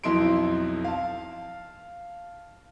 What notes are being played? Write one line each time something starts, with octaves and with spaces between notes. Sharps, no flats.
B1 F2 D#4 E4 C6 D7
F5 A5